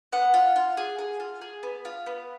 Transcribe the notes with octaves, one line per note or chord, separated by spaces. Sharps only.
B3 F#5
F4
F4
G#4
G#4
F4
G#4
B3
F4
B3